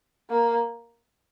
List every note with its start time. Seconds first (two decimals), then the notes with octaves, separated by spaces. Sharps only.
0.30 A#3